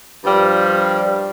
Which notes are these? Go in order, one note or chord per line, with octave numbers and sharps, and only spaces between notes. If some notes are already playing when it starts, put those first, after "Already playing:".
G2 F3 G3